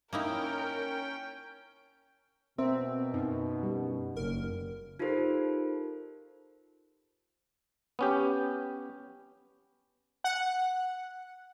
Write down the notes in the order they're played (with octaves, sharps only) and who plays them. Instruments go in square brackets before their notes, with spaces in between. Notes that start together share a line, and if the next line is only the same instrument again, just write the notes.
[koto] A#3 D#4 E4 [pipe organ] C#4 G5 [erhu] A#4
[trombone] B2 [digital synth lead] C4 [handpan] A#4 C5 E5
[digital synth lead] F#2 [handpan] D#4
[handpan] G3
[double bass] F#1 [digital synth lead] A#4
[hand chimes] D#4 F4 G4 A4 A#4 C5
[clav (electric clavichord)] B3 C#4 G4
[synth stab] F#5